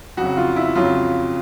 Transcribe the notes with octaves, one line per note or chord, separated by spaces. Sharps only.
F2 C#3 F#3 F#4
F4
E4
F2 C#3 F#3 F4